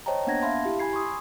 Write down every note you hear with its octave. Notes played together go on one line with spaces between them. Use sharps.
C5 C#5 D#5 G5 A5 A#5
A#3 B3 D4 F#5 G#6 A#6
E5 F5 A5 B5 C6
E4 G4
G#5 B5 G#6 C7
C6 C#6 D#6 E6